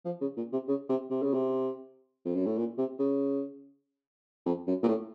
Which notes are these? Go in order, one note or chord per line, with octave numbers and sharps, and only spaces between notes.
F3
C#3
A#2
C3
C#3
C3
C3
C#3
C3
F2
F#2
A2
A#2
C3
C#3
F2
F#2
A#2
A2